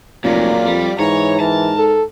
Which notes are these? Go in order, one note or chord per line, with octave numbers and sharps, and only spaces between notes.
F1 A#2 F#3 A#3 F4 D5
F2 G3
G#2 E3 C#5 A#5
E3 A#4 A5
A4